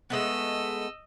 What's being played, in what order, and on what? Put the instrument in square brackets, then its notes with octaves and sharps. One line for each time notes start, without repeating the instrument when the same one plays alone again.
[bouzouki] G#3 A3 B3 [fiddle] D#5 E6